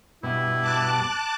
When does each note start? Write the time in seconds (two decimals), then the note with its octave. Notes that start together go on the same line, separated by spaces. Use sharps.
0.23 G2 B2 E4
0.61 A5 D6 F#6